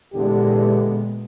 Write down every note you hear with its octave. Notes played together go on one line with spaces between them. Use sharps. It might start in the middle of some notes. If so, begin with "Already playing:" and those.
E2 A#2 D3 G#3 B3 G4